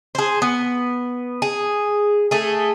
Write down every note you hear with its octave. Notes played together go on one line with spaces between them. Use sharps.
G#4 C5
B3
G#4
A3 G#4